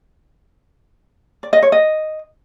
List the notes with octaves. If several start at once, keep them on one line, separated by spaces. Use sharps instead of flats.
D5
D#5
C#5
D#5